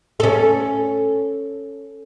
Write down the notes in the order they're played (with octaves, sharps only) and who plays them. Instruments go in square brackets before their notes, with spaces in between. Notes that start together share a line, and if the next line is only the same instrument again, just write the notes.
[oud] C#4 A4